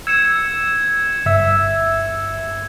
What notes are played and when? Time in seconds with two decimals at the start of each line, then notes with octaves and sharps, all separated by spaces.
0.07 E6 G#6 C#7 E7
1.26 G1 E5 E6